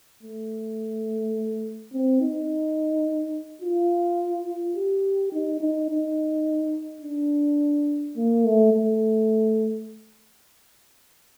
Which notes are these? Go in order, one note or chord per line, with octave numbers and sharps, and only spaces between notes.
A3
C4
D#4
F4
G4
D#4
D#4
D#4
D4
A#3
A3
A3